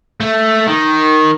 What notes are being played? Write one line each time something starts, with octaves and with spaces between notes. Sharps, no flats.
A3
D#3